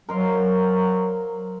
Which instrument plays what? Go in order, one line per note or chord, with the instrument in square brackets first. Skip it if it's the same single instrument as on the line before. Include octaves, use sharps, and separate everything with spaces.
[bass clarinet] F#3 [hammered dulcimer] A#4 C5 F5